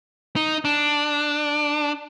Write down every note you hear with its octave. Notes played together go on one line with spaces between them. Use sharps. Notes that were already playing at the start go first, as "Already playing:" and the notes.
D#4
D4